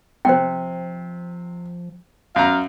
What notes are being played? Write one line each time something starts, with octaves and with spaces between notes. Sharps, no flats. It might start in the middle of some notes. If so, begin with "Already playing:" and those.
C3 F3 C5 G5
F#2 F5 A#5